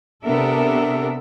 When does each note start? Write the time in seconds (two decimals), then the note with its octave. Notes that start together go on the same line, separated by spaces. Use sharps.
0.25 C3 B3 D4 A4 A#4 E5